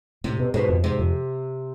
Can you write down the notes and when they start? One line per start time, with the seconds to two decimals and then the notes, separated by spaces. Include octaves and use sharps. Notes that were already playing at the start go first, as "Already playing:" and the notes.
0.24 A2 C3
0.40 B2
0.54 G#2 B2
0.69 F2
0.83 G#2 C3
0.99 F2